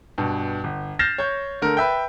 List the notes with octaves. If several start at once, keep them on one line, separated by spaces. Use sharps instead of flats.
G2 B2
G1
F6 G6 A6 A#6 C7 E7
C#5 G6
D3 A3 A#4
B4 E5 G5